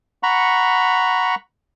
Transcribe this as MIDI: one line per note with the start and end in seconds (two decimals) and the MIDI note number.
0.23 1.35 78
0.23 1.35 82
0.23 1.35 83
0.23 1.35 85